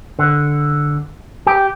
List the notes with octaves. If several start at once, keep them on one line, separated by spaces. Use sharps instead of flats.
D3
G4